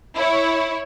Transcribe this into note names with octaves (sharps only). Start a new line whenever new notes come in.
E4 C#5